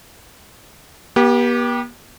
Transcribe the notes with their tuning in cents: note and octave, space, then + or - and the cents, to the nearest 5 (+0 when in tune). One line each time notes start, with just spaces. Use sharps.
B3 -45 G4 +0